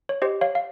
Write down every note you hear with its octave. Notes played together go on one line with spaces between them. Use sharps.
C#5
G4 C5 D#5
C#5 F5
F5